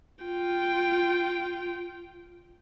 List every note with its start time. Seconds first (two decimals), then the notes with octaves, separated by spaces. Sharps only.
0.24 F4 G5